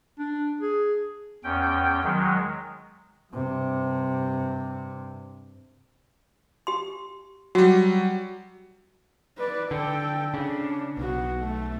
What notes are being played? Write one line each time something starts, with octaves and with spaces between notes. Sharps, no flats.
D4
G#4
E2 C#4 G5
D#3 F#3 G#3
G2 C3
G4 C6
F#3 G3 F#4
B4 D5
D3 A4 G5
C#3 D4
B1 B3 F#4
A3